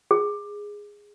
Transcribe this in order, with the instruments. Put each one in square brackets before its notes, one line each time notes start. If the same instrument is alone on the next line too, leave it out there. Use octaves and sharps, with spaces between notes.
[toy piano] G#4